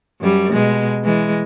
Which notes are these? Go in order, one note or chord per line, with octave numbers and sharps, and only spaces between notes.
F#2 G3
B2 G#3
E3 G#3